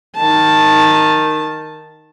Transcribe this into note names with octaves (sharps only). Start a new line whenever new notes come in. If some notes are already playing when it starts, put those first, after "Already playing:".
D#3 A5